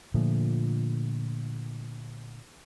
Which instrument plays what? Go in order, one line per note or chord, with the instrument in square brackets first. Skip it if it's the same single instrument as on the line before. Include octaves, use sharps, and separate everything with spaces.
[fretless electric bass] A#2 D3 F3 A3